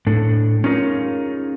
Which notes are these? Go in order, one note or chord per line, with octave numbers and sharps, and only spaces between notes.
A2 D4 A4
C#4 D#4 F4 G#4 A#4 C#5